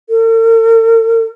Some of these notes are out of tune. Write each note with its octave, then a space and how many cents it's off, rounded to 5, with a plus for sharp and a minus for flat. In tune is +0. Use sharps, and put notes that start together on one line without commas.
A#4 -45